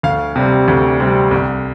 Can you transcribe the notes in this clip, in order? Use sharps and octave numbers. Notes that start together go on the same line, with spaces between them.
D2 F5
C3 G3 C4
D2
C3 G3 C4
C2